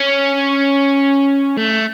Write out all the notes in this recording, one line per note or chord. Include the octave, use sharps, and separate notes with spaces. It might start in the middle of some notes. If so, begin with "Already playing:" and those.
Already playing: C#4
A3